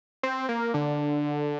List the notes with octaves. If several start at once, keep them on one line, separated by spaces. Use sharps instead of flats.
C4
A#3
D3